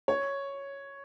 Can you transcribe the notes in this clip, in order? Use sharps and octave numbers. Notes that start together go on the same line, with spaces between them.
C#5